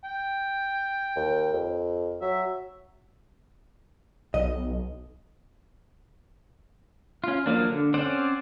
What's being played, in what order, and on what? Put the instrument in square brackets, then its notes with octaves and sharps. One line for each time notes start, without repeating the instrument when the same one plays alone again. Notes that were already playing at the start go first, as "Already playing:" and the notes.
[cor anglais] G5
[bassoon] D#2
F2
[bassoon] F#3 [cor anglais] E5
[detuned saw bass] B1 [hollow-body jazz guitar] D#5
[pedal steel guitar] C#4 F4
F3 F#3 A#3 D4
D3
C4 C#4 C5 D5 F#5